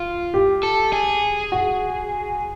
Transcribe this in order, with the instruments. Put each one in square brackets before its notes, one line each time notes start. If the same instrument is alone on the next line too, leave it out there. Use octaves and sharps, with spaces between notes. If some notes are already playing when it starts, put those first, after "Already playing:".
Already playing: [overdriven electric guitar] F4
[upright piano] G4
[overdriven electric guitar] A4
G#4
[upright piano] F#4